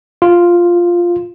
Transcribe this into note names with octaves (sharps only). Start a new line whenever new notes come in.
F4